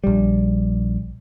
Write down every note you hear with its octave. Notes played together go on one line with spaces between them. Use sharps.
A#1 G3